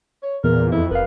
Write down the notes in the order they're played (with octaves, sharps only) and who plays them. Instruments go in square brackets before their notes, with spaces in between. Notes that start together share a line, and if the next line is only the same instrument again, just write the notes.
[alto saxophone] C#5
[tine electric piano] E2 [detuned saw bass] A#2 [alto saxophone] A#4
[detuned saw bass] F2 [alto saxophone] E4
[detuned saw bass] F1 [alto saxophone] B3 [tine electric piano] A#4 F5